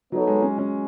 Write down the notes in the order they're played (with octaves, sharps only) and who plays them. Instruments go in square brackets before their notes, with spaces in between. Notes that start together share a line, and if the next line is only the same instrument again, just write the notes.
[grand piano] F#3 [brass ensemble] B3 D#4 A4 C#5
[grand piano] G#3
C#4
C#4